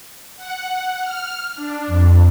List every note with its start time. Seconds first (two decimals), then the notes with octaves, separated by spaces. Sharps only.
0.36 F#5
1.01 F6
1.55 D4
1.87 F2